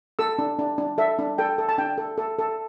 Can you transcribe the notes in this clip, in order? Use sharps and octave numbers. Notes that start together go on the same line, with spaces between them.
A4 E6
D4
D4
D4
A4 E5
D4
A4 G5
A4
A5
D4 G5
A4
A4
A4